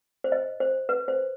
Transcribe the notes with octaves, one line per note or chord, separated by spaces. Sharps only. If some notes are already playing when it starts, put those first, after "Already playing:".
C5
D#5
C5
B4
C5